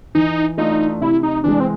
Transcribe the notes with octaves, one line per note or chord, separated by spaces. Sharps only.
E3 D#4
A3 D4 D#4 F4
C3 E4
D#4
E3 G#3 D4
C4